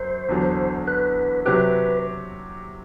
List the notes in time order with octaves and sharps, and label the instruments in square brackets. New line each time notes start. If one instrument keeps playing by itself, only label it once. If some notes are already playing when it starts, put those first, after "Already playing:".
Already playing: [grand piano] F#2 [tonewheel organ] C5
[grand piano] E2 D3 F#3
[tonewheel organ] B4
[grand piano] C3 F#3 C4 G4 [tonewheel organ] B4